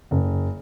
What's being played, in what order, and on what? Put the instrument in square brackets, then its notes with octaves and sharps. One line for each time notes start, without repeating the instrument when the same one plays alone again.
[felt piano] F#1